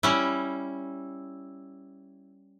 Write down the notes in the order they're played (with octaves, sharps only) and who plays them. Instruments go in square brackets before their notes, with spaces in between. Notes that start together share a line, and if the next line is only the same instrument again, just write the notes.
[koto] G3 C#4 E4